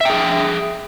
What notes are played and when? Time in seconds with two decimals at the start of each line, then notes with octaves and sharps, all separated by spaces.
0.01 E5
0.05 G5
0.10 G#4